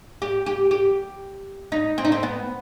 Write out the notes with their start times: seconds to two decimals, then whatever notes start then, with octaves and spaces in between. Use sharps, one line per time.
0.22 G4
0.46 G4
0.71 G4
1.72 D#4
1.98 C4
2.05 D#4
2.12 C4
2.23 B3